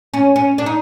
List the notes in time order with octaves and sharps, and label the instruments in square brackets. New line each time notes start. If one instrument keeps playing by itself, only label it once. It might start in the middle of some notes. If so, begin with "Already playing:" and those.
[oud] C#4
C#4
D4
D#4